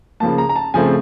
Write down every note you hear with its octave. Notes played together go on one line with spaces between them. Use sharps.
C#3 F3 A#3 A5
A#5
A#5
A5
C#3 F3 A3 C4 G#5